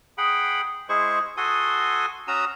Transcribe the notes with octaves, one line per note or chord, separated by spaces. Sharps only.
G#4 F#5 G5 B5
G#3 E4 G#4 C5 C#6
F#4 A4 G#5 C6 D#6
C#4 F#4 A#5 D#6 E6